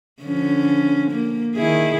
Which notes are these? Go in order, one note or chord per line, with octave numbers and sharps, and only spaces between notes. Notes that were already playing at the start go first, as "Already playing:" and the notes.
D3 F3 C#4
A#3
D#3 E4 G#4